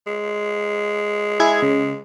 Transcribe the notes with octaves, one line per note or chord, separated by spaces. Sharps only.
G#3
E4 G#4 G#6
C#3